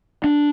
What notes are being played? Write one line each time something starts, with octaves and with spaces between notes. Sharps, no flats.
D4